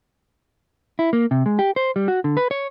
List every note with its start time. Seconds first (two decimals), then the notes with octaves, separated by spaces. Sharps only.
0.99 E4
1.13 A#3
1.31 C3
1.46 G#3
1.59 G4
1.76 C5
1.96 G3
2.08 F#4
2.24 D3
2.37 B4
2.51 C#5